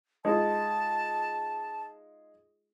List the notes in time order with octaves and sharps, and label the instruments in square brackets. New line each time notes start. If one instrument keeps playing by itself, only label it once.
[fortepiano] G#3 D#4 F4 [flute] A5